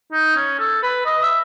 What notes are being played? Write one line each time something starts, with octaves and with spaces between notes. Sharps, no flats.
D#4
C#4
A4
B4
D#5
E5